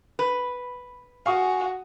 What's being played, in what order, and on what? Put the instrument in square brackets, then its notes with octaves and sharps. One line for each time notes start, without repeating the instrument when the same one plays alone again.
[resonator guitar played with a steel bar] B4
[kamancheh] F#4 [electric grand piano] F5 C#6 D#6 [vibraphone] G#5